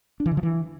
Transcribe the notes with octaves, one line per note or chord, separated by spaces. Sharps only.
D4
E3
D3
F3
E3